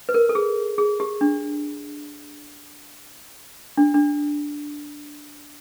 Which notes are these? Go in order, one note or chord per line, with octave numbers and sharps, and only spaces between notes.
B4
A#4
A4
G#4
G#4
G4
D4
D4
D4